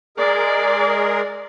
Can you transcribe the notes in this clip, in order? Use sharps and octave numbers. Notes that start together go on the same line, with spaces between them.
G#3 G#4 A#4 D5